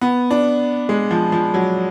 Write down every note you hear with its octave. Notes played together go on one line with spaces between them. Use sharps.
B3
D4
G#3
F3
F3
F#3